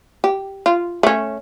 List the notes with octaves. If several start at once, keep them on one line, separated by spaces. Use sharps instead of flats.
G4
F4
A3 C#4